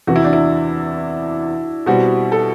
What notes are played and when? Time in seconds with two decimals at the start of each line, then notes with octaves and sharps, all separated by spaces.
0.07 E2 C3 E3 F#4
0.16 E4
0.24 D4
0.33 E4
1.86 B2 G3 C4 F#4
2.32 A4